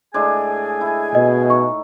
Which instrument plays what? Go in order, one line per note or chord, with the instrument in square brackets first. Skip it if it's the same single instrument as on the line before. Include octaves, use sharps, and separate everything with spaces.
[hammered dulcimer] A2 G#3 D4 [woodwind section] G#4 G#5 [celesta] G#6
[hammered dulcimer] E4
[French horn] B2 [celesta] D#5
[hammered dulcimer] D#4 [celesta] C#6